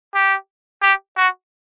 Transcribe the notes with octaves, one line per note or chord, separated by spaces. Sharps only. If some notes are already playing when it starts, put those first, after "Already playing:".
G4
G4
F#4